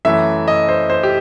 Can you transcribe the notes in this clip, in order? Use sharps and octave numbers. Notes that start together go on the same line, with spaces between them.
F#2 E3 A3 E5
D#5
C5
C5
G4